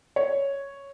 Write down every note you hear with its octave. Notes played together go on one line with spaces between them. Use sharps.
C#5